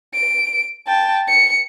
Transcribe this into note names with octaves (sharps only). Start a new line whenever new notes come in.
D7
G5 A5
C#7